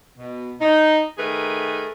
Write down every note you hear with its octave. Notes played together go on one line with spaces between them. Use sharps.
B2
D#4
D#3 A3 G#4 A#4 B4